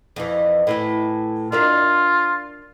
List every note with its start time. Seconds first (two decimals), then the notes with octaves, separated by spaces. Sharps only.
0.16 F2 E3
0.67 A2 E3 E4
1.52 D4 F4 A#4 E5